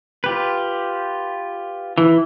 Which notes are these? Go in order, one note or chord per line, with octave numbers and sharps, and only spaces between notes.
F4 G4 B4
E3